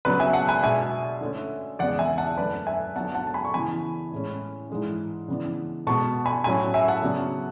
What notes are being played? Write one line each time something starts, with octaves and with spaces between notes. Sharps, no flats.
C#3 F#3 B3 D4 B4 D5
E5 G#5
F#5 A5
G#5 B5
B2 G#3 D4 E5 G#5
D3 A3 C#4
E2 C#3 G#3 B3 D5 F#5
E5 G#5
F#5 A5
F#2 D3 A3 B4 D5
E5 G#5
D3 F#3 B3 F#5 A5
F#5 A5
A5
G#5 B5
C#6
C#3 E3 B3 G#5 B5
A2 G#3 C#4
G#2 E3 G#3 D4
C#3 E3 B3 D4
B2 G#3 B3 A5 C#6
G#5 B5
A2 F#3 C#4 G#5 B5
E5 G#5
F#5 A5
C#3 F#3 B3 D4